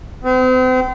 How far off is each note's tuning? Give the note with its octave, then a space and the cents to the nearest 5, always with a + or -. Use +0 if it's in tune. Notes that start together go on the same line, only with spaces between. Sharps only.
C4 -40